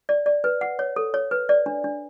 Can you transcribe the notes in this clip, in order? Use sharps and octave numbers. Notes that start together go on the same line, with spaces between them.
D5
D5
B4
F#5
C#5
A4
C#5
B4
D5
D4
D4